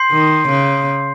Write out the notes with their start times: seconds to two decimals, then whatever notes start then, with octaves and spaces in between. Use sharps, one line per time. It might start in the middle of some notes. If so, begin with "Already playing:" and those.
Already playing: C6 G6 C7
0.12 D#3
0.49 C#3